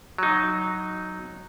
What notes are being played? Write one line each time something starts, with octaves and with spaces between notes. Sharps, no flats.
F#3 D#4